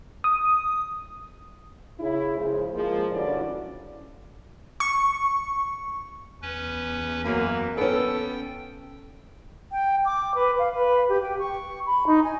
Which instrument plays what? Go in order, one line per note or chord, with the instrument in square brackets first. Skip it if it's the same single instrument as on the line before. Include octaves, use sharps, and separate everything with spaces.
[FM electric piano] D#6
[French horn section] C#3 E4
F#2 C#3 F3 G#3 C5
F3 G#3 A#3
G2 D3 C#4 E4 F#4 D5
[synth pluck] C#6
[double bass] E2 [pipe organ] C#4 B4
[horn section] F#2 A#3 [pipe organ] E3
[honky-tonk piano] B3 C#4 [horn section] A4 [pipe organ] G5
[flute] G5
D6
B4
F5
B4
G4
G5
C#6
B5
D#4
G#5